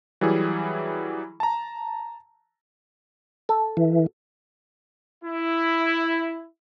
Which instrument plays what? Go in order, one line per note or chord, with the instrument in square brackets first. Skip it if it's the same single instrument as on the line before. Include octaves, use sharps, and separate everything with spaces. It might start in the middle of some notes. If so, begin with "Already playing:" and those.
[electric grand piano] E3 F#3 G3 E4 G#4
A5 A#5
[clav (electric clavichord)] A4
[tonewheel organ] E3
[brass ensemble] E4